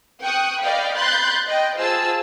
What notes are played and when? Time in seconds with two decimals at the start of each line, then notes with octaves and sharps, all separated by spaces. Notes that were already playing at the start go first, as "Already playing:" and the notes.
0.22 G5 C#6 D#6 F#6
0.61 D5 D#5 F5 G5 B5
0.98 B5 C6 F#6 G6 A6
1.47 D#5 G5
1.77 F4 G#4 C5 A5 E6